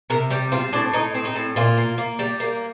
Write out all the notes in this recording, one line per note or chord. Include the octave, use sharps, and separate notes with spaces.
C3 A#4
G3 G4
C4 F4
A2 D4
A2 D#4
C4
D#4
A2
A#2 F4
A#3
A#3
G3
A#3